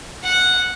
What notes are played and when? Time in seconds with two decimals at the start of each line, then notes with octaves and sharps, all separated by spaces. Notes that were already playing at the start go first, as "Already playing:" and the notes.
0.23 F#5